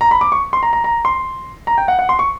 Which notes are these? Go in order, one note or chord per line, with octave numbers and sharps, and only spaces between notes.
A#5
B5
D6
C#6
C6
A#5
A#5
A#5
C6
A#5
G5
F#5
F#5
C6
C#6